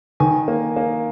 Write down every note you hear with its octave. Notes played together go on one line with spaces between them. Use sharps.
D#3 G#5
A#3
A#3